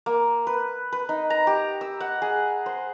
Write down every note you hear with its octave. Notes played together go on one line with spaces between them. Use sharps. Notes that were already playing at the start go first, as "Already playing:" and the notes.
A#3
B4
B4
D#4
A#5
G4
E6
F#5
G#4
C5